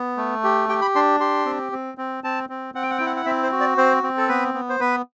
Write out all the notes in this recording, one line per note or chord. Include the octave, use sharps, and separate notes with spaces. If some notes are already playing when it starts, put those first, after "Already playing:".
Already playing: B3
A3
G4
G4 G5
B5
D4 C6
G4 C6
C4
C4
C4
C4 A5
C4
C4 F#5
G5
F#5
E4 G5
F#5
F#5
C4 E5
C5
F#4
D5
C4 C5
C4
A4
B3 B4
B3
C5
B3 B4